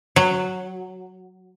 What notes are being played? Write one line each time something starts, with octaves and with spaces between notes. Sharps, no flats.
F#3